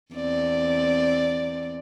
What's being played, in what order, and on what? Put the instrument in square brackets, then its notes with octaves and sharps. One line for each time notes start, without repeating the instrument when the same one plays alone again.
[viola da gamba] E2 C4 D5